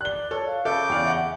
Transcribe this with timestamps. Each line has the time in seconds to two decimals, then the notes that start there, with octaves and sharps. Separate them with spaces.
0.01 D5 F#6 G7
0.31 A4 C#5
0.47 F5
0.65 C#3 A4 E5 D6 G6
0.90 E2 D5 F5 G5
1.04 D#5 E5 F#5